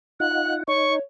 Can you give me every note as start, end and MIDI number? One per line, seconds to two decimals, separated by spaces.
0.20 0.63 63
0.20 0.63 65
0.20 0.63 78
0.20 0.54 90
0.68 0.99 63
0.68 1.00 73
0.68 0.94 85